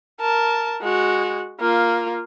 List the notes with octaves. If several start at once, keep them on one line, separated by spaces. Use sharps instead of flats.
A#4 A5
G#3 F#4
A#3 F4